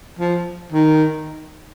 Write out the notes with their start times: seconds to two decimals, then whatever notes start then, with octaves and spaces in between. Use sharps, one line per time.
0.19 F3
0.72 D#3